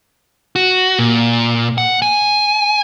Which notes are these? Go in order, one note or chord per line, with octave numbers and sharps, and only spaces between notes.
F#4
A#2
F#5
G#5